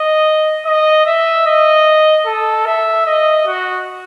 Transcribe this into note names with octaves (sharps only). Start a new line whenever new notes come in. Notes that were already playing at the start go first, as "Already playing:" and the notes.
Already playing: D#5
D#5
E5
D#5
A4
E5
D#5
F#4